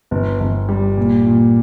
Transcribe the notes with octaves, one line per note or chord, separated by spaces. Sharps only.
G1
G1
G3
A#2
A#2